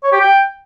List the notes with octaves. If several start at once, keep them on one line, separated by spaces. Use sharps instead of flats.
C#5
G4
G5